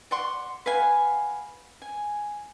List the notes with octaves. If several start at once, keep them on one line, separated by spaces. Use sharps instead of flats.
D5 F#5 C6 C#6
B4 F5 F#5 G#5
G#5